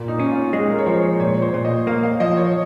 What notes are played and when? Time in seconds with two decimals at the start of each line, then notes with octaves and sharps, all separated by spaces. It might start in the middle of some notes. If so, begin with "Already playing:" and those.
Already playing: A#2 A#3
0.08 D#4
0.20 C#4
0.31 F4
0.53 G#3 G#4
0.70 A#4
0.79 C#5
0.86 F3 C5
1.03 C#5
1.20 A#2 C#5
1.42 C5
1.54 A#2
1.65 D#5
1.87 A#3 F5
2.03 F5
2.20 F3 D#5
2.37 C#5